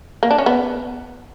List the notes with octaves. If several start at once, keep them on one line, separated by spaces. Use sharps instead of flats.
A#3
D4
C#4
B3